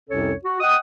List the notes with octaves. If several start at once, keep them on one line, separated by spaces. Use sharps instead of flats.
C2 F2 C3 C#4 A4 C#5
F#4
D#5 F#5 G5 D#6